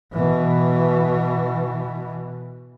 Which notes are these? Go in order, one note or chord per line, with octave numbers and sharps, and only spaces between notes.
B2 E3